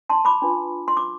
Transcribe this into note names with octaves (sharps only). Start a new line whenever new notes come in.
A5 C6
B5 D6
D4 F4 B4
C6
D6